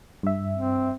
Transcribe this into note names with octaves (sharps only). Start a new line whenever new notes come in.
G2 E5
C4